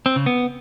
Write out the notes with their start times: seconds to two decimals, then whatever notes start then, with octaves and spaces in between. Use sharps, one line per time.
0.06 C4
0.16 C#3
0.26 B3